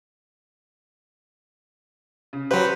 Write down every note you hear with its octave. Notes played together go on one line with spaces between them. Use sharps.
C#3
F#3 G4 B4 C5